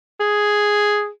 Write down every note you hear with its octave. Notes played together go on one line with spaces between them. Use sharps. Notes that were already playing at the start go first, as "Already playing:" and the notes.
G#4